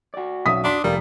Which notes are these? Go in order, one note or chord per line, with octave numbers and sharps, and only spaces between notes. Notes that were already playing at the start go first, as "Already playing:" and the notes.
F#4 D5
B1 C#4 E5 D#6 B6
D4 C6 D6
F1 G3 A#4 D5 F5